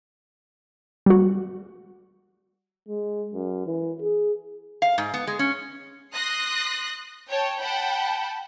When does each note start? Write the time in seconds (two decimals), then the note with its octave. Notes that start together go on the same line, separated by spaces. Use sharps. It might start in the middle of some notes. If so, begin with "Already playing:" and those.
1.06 G3 F#4
2.89 G#3
3.34 F#2
3.67 E3
4.01 G#4
4.82 F5
4.98 G#2
5.14 B3
5.27 G#3
5.39 C#4
6.13 C6 D#6 F#6 A#6 C7
7.29 C#5 G5 A5
7.58 F#5 G5 A5 B5